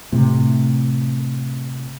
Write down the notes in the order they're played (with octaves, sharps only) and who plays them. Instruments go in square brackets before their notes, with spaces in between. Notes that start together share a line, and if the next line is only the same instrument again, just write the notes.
[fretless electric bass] A2 C3 A3